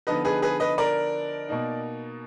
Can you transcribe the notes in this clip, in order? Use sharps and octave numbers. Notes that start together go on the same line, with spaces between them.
D3 F3 B3 D#4 B4 D#5
G#4 B4
G#4 B4
B4 D#5
A#4 D5
B2 A#3 D#4